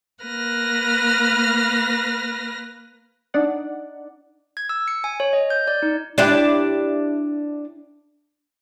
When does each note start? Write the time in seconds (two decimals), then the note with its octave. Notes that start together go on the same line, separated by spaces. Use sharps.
0.24 A#3 B4 F6 A#6
3.34 D4 D#4 D5 F#5
4.57 G#6
4.69 E6
4.88 C#7
5.04 G#5
5.20 C#5
5.33 D#5
5.50 G6
5.68 D5
5.83 D#4
6.18 D4 E4 G4